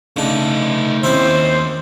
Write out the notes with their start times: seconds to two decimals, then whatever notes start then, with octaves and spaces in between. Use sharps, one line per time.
0.16 C#3 A3 D4 D#4
1.03 D#2 C4 C#4 E4 C5